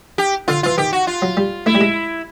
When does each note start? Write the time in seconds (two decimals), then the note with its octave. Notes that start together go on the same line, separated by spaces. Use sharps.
0.18 G4
0.48 D3 F4
0.63 E3 F4
0.78 D#3 G4
0.93 F#4
1.07 F4
1.22 F#3
1.37 G3
1.66 A3 E4
1.75 G3
1.81 G#3